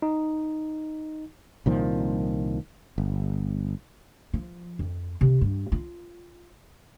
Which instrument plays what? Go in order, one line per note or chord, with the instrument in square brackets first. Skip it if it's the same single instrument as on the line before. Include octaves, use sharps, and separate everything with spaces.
[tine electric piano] D#4
[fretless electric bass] C2 A#2 D#3 F3
G1
[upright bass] F3
F2
C3
G2
F4